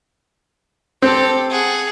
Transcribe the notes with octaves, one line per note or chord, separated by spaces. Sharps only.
C4 G4 A4
G#4 F#5